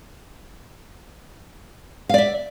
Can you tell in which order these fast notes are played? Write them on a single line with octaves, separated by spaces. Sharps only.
F5 D5 E5